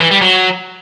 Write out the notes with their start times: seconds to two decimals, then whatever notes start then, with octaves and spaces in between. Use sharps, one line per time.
0.01 E3
0.11 G3
0.21 F#3